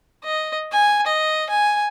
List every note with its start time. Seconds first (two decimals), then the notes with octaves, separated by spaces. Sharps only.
0.24 D#5
0.72 G#5
1.07 D#5
1.50 G#5